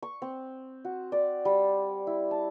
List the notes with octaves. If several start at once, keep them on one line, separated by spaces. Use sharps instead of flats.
C#6
C4
F#4
D5
G3
E4
A5